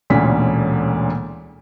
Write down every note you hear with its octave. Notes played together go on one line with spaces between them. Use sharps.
E1 D2 A#2 D3 C#4 B6